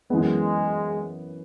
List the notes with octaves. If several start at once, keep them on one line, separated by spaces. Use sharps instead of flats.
F#2 E3 G#3 B3